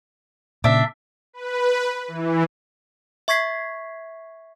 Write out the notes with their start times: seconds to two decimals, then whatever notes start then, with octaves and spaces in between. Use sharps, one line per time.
0.64 A#2 C#3 D4 E5
1.33 B4
2.08 E3
3.28 E5 C#6 G#6 B6 C7